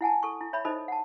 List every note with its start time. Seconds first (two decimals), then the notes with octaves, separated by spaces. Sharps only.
0.01 E4 F#5 G#5 A5
0.23 A4 C#6
0.41 E4
0.53 C#5 E5 B5
0.65 D#4 A4 C5 D#5 B5
0.88 F#5 A5